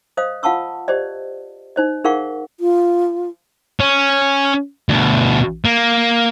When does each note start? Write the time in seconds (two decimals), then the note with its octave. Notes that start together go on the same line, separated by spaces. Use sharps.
0.17 C5 D#5 F5 D#6
0.43 F4 F5 F#5 A5 C#6 E6
0.88 G4 C5 D5 D#5
1.76 D#4 C5 D#5
2.04 D#4 G#4 A#4 F5 F#5 C#6
2.60 F4
3.80 C#4
4.89 D2 B2
5.65 A#3